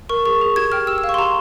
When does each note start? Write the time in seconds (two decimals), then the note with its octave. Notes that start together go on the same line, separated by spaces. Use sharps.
0.09 A#4 C#6
0.25 G#4 C#6
0.41 G#4
0.56 G4 G#6
0.72 G5 F6
0.87 G4 E6
0.98 E6
1.04 F5
1.09 C#6
1.14 C6
1.18 G4 A#5